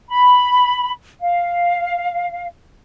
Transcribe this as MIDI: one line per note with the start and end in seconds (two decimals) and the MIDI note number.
0.09 0.92 83
1.21 2.47 77